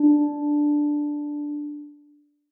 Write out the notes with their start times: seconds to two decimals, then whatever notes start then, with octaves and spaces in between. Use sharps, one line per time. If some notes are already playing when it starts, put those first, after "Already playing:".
Already playing: D4